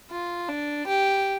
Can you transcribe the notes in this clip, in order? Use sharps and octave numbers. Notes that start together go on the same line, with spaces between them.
F4
D4
G4